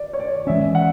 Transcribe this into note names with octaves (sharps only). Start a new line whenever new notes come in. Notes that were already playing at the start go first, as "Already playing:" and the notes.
Already playing: D5
C#5
D5
E3 G#3 C#4 E5
F#5